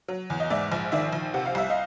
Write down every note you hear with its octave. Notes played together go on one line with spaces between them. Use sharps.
F#3
E2
D#5
G#2 D5 E5
A#1
D#3 D5 E5
A#1
C3 F#5
F5
C2 E5
D#5 F5